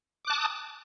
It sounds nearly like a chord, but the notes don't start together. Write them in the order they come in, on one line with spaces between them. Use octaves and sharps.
D6 F#6 A5 D#6